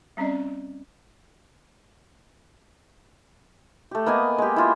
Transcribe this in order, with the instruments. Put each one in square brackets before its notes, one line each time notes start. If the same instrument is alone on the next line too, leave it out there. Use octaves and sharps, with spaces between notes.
[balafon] G3 C4 C#4 D5 D#5
[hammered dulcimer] A3 G4
A#3 B3 D#5 G#5
G#3 G4
E4 F4 D6